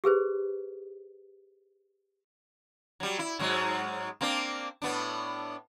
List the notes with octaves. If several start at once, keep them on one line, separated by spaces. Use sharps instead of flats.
G4 G#4 B4 C5
F#3 G3
E4
G#2 F#3 G#3
A#3 C4 D4
A2 B3 D4